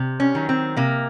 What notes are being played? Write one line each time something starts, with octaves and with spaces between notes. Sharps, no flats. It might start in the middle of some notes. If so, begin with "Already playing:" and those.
Already playing: C3
C#4
D#3 F#3
C4
C3 A#3